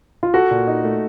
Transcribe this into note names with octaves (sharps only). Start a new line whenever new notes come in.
F4
F#4 A4
A#2
D#4
A3